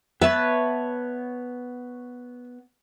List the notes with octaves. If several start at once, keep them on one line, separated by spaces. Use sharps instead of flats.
B3 B4 C#5 E5 A5